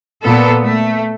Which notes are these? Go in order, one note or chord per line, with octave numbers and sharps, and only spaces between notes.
A#2 B3 A4
A3